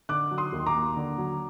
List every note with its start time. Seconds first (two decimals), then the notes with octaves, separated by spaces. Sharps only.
0.09 D3 D6 F#6
0.31 F#3
0.38 C6 D#6
0.52 D#2
0.66 A#5 D6
0.74 A#3
0.96 D3
1.18 F#3